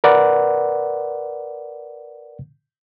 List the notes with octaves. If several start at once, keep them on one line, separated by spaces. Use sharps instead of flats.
A#4 B4 D5 F#5